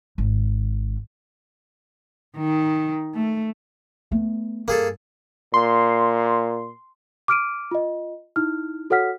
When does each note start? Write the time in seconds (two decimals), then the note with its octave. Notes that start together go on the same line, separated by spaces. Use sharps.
0.18 G#1
2.37 D#3
3.15 A3
4.11 A3 B3
4.68 G2 A#3 G#4 A4
5.54 A#2 C6
7.28 D6 F6 D7 D#7
7.71 F4 D#5
8.36 D#4 E4 F6
8.90 F#4 A4 C#5 F#5 F6 B6